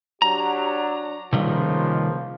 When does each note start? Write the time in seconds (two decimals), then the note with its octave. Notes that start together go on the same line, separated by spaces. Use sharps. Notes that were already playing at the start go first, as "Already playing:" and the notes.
0.22 F#3 D4 G4 A#5
1.33 C#2 C3 D#3 F3 G3 A#3